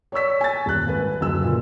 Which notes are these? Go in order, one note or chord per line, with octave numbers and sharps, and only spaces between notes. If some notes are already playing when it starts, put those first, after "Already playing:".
C#5 D5 C#6 E6 B6
G#5 A6
D#1 F#6
G#1 B4
F#1 D2 F#3 E6
A#2